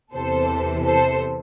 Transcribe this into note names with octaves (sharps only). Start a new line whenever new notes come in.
E2 C3 E3 A4 C5
A4 C5